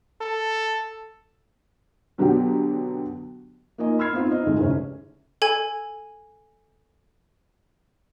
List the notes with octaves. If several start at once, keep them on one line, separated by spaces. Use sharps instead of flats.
A4
B2 D3 F#3 B3 F#4 G4
A#3 D#4 F4 D#5 G#5
B5 E6 F6 G#6 C7
B3 C4 D#4 F4
D#4 D#5
D2 G#2 G#3 A3
F1 C3 C#4 D4
A4 G#5 G#6